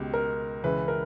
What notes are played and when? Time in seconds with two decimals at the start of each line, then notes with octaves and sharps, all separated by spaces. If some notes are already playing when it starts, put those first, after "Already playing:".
Already playing: C#2 B2 G4
0.14 A#4
0.64 C#2 C#3 E3 B4
0.88 A#4